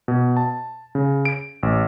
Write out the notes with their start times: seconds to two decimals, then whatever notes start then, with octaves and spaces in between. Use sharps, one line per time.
0.08 B2
0.37 A5
0.95 C#3
1.25 D7
1.63 A1